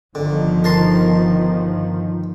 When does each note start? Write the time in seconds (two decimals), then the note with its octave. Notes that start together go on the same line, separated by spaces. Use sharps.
0.15 G1 D3 D#3 F3
0.64 A#4 A5 C6